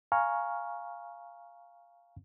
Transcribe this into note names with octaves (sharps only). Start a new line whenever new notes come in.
F5 G#5 A#5 C#6 F6